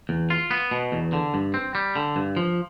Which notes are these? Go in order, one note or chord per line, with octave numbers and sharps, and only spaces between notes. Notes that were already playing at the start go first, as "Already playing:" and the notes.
E2
F4
B3
B2
E2
D3
G2
C4
G3
D3
G2
F3